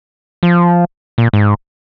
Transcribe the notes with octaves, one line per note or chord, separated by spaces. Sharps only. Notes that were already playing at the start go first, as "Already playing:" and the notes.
F3
A#2
G#2